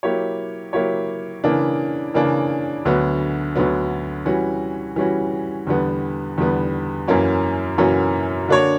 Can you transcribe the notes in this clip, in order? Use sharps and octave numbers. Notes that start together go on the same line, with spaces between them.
F#3 A#3 E4 G4 C#5
F#3 A#3 E4 G4 C#5
C#3 E3 A#3 D4
C#3 E3 A#3 D4
D2 D3 F#3 B3
D2 D3 F#3 B3
E3 G3 C#4 F#4
E3 G3 C#4 F#4
E2 D3 G3 B3
E2 D3 G3 B3
F#2 E3 A#3 C#4 F#4
F#2 E3 A#3 C#4 F#4
D3 A#3 D4 F#4 C#5